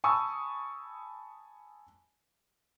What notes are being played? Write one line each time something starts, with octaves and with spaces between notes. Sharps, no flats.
G#5 A5 B5 C#6 D#6 E6